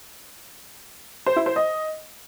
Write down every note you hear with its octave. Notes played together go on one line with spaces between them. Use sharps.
C5
E4
C5
D#5